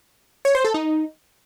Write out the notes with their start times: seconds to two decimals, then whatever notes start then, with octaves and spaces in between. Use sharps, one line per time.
0.45 C#5
0.55 C5
0.65 A4
0.74 D#4